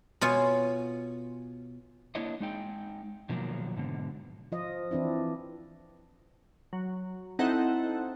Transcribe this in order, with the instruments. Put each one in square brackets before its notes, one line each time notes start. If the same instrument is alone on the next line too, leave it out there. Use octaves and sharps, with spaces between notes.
[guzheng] B2 F4 C#5 G#5
[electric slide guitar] A#3 D4 E4 C#5 D#5
G#3 D#4 G5
B2 D3 D#3 F3 F#3 A#3
G#2 B2 D3
[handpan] F3 F4 D#5
E3 C4 D4 E4
[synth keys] F#3
C4 D#4 E4 A4 C5 F#5